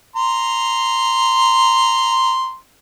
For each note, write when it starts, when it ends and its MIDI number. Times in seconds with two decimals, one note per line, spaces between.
0.16 2.55 82
0.16 2.55 84